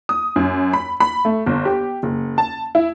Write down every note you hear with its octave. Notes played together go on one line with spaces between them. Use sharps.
D#6
F#2
B5
B5
A3
G1
G4
F#1
A5
E4